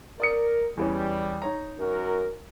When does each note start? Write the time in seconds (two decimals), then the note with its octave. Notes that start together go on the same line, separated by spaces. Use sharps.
0.20 A#4 D5 D#6 C#7
0.77 E2 E3 G3 C#4
1.42 D#4 C#5 A#5
1.80 F#2 F#4 A#4